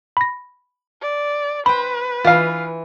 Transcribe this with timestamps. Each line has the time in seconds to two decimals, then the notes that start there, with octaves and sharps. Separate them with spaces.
0.17 B5 A#6
1.02 D5
1.66 B4 C5 G5 B5
2.24 E3 F4 F5